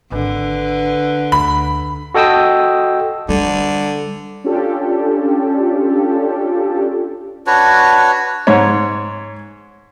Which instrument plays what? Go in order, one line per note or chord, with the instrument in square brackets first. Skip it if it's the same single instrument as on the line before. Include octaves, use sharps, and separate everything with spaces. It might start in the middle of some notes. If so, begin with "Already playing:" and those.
[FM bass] G#1 [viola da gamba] D3 [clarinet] B4
[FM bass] D2 [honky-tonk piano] B5
[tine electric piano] F#4 A4 D#5 G5 D#6 E6
[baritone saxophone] D3 [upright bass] G3
[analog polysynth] C#4 D4 F4 G4 A4
[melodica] D4 F#4 B4 C#5
[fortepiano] G#2 C#5